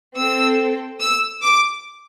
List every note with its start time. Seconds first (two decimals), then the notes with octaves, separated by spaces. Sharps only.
0.15 C4 A4 E6
1.00 E6
1.42 D6